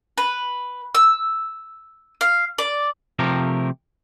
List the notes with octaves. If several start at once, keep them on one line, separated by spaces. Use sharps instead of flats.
B4
E6
F5
D5
C3 F3 A3 G4 A#4